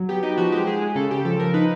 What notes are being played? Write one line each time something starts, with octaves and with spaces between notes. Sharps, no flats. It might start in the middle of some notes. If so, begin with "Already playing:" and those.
Already playing: F#3
B3 G4
D#4 G4
F3 F#4
G#3 G4
G#3 G#4
G#3
C#3 A4
C#3 G4
F3 A4
F3 A#4
D#4 B4